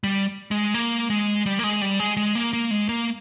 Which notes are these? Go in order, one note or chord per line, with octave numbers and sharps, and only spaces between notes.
G3
G#3
A#3
G#3
G3
A#3
G#3
G3
G#3
G#3
A#3
A#3
G#3
A#3